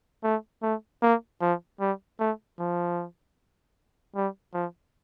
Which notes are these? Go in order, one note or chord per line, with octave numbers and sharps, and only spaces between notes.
A3
A3
A#3
F3
G3
A3
F3
G3
F3